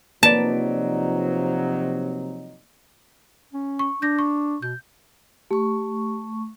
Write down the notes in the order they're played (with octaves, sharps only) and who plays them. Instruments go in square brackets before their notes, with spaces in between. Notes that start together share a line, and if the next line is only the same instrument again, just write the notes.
[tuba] C3 [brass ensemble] F3 F#3 D#4 [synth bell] A#3 B4 D5 [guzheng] A5
[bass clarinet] C#4
[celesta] C#6
[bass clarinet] D4 [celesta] G6 A#6
[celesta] C#6
[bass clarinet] B2 [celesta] G6
[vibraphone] A3 C#6 [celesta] G4